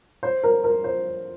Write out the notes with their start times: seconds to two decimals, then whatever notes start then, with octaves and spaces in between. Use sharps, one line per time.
0.23 C5
0.43 A#4
0.64 A#4
0.84 C5